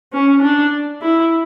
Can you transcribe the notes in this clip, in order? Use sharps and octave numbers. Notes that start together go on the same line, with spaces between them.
C#4
D4
E4